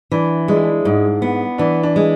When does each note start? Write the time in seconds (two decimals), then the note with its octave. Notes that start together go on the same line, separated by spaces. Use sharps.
0.11 E3 D4
0.48 G#3 D4
0.56 E4
0.64 D4
0.85 G#2
1.22 B3
1.58 E3 D4
1.83 D4
1.96 G#3